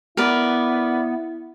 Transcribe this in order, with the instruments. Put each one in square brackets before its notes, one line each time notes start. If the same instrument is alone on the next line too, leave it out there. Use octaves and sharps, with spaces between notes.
[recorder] B3 [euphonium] E4 [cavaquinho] A#4 B4 D5